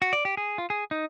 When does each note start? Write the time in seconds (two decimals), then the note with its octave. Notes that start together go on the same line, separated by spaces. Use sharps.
0.02 F#4
0.13 D5
0.25 G4
0.37 G#4
0.58 F4
0.70 G#4
0.91 D#4